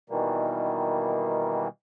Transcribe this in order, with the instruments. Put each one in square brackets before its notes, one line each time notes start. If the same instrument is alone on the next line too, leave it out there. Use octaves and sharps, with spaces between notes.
[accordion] B2 D#3 E3 G3 A#3